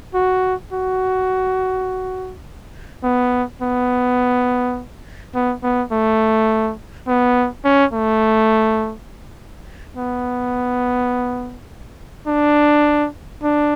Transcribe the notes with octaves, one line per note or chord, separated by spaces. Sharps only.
F#4
F#4
B3
B3
B3
B3
A3
B3
C#4
A3
B3
D4
D4